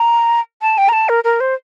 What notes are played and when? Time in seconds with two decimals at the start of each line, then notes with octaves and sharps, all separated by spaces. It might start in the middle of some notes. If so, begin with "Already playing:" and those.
Already playing: A#5
0.62 A5
0.78 G5
0.89 A#5
0.93 A5
1.09 A#4
1.24 A#4
1.40 C5